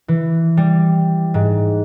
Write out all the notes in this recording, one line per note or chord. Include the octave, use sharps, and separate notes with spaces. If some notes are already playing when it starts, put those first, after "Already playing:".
E3
G3
G#2